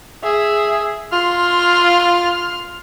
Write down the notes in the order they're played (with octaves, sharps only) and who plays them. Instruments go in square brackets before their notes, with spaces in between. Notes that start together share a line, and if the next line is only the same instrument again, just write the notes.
[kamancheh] G#4 E5
[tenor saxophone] F4 [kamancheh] C6 F6